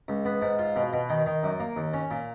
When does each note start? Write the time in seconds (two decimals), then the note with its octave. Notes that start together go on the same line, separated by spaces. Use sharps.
0.08 C#2
0.25 B3
0.42 G#2
0.59 F4
0.76 B2
0.93 B2
1.09 D#3
1.26 D#3
1.43 F#2
1.60 A#3
1.76 D#2
1.94 C#4
2.11 A#2